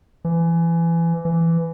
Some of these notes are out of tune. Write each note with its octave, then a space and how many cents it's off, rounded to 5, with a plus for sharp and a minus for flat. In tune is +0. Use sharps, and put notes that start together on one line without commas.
E3 +25
E3 +15